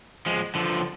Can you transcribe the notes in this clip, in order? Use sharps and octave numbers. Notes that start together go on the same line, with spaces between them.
F3 G#3
D3 F3